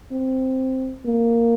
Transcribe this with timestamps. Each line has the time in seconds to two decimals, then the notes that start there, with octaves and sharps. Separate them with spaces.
0.12 C4
1.05 A#3